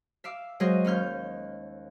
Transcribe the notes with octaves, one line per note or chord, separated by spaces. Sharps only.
E5 F5 D6
F#3 G#3 G#4 C5 D#5 F5
D#2 C#4 F6 G6